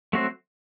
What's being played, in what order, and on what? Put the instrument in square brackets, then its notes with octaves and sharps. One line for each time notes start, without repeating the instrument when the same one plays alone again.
[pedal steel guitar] F#3 A3 C4 F#4 C5